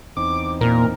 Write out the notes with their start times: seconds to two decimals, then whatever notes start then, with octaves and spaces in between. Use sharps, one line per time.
0.17 E2 C4 D#4 D6
0.61 A#2 A#3 A#4